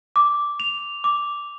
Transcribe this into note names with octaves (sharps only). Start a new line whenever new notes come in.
D6
F7
D6